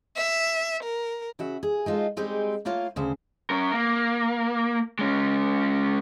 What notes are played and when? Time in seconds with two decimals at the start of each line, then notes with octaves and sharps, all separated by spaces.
0.16 E5
0.83 A#4
1.39 C#3 F#4 E5
1.63 G#4
1.86 G#3 D#4 F4 F#4 A4
2.17 G3 G#3 C4 D#4 G4 G#4
2.65 A3 A#3 F4 C#5 F5
2.96 D2 C#3 C5
3.50 C#4 A#4
3.74 A#3
4.99 G#3 C#4